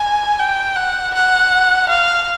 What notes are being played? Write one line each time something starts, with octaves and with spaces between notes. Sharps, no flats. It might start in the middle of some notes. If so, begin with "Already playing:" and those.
Already playing: G#5
G5
F#5
F#5
F5